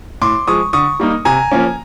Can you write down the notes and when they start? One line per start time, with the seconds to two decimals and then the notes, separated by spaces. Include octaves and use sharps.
0.22 A2 C6 D6
0.47 F3 G#3 C#6 D#6
0.73 D3 C#6 D#6
1.00 G3 A#3 D#4
1.25 C3 G#5 A#5
1.52 F3 A#3 C#4